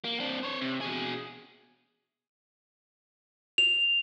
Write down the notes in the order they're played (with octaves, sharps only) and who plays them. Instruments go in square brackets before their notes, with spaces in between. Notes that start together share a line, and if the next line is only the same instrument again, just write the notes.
[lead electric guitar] A#3
C4 D4
C5 C#5
C3
B2 G#4
[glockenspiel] F7